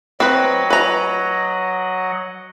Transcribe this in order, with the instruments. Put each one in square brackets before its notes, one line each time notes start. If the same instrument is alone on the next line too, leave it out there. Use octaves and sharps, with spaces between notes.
[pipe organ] F#3 D#5 F#5 [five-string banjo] C4 B4
[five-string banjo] B4 A#5